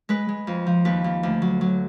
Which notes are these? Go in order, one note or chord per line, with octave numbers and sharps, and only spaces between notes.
G#3 B4
G#3
F2
F3
D#2 B4
D#2
D2
F#3
F#3